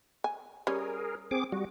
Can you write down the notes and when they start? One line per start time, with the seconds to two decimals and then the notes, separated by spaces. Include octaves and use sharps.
0.24 G#5
0.67 G3 C#4 G#4 A#4
1.31 C4 G#4 D6
1.52 G3 F#4